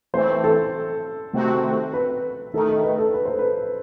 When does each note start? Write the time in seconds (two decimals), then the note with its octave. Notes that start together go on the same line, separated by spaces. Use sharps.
0.14 E3 A3 C4 C5
0.44 A4
1.33 C3 D#3 A3 C4 F#4
1.94 B4
2.54 D#3 A3 D#4 A4
2.69 A4
2.83 B4
2.98 A4
3.14 B4
3.26 C5
3.39 B4